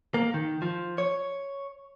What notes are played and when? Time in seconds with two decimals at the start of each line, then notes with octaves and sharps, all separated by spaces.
0.14 A#3
0.34 D#3
0.62 F3
0.98 C#5